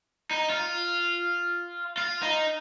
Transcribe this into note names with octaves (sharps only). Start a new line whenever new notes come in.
D#4
F4
F4
D#4